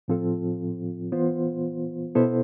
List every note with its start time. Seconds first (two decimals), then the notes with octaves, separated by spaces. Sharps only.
0.08 A2 F3 C4 F4 A4
1.12 E3 B3 F4 C5
2.15 B2 B3 E4 A4 C5